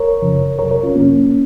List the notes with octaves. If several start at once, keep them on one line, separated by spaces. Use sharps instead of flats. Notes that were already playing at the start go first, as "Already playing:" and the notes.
Already playing: A#4 C#5
F#2 C#3 F3
F2 C3 F#3 A#4 C#5
A#4 C#5
C#4 F4
F2 C3 F#3 A#3 C#4